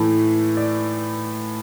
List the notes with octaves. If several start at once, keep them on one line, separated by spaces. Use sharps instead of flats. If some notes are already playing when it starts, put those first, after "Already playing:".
Already playing: A2 E3 A3
D5